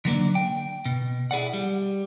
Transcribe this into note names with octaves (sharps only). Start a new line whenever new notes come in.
D3 F#3 A#3 D4
G5
B2
E4 G#4 D5 F#5
G3